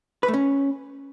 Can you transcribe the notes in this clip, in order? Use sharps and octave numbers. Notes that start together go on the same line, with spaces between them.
B4
A3
C#4